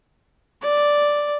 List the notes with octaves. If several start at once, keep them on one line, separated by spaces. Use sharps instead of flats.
D5